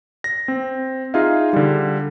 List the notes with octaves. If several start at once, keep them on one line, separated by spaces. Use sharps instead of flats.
A#6
C4
D#4 F4 G#4 E5 F5
D3 G3